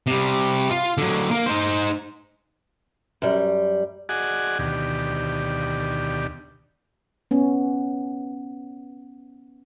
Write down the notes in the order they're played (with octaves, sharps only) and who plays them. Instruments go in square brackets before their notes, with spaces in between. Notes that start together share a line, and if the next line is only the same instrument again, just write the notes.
[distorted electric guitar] C3 G3
F4
D3 F#3
A#3
D#4 C5
[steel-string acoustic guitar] F#2 G3
[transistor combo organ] F#4 G#4 D5 D#5 F#5 G#5
D2 B2 D#3 G4 D5
[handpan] B3 C#4